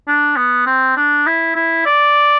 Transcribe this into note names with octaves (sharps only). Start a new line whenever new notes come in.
D4
B3
C4
D4
E4
E4
D5